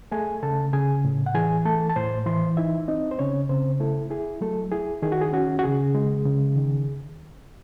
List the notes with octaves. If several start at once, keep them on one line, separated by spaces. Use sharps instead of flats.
A3 G#4 G#5
C#3 A4 A5
C#3 G#4 G#5
A2
F#5
E3 G#4 G#5
A3 A4 A5
A5
A2 C5 C6
E3 C5 C6
D#4 E4 E5
C4 D#4 D#5
C5
C#3 C#4 C#5
C#3 C4 C5
A3 E4 A4
E4 G#4
F#3 A3 A4
E4 G#4
D#3 G#4
F#4
G#4
C#4 F#4
F#4
C#3 G#4
G#3
C#3
D#3